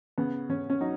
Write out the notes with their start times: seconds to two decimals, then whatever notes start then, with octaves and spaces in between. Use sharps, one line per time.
0.18 C#3 B3
0.49 C#3 C#4
0.70 C#4
0.81 F#3 D#4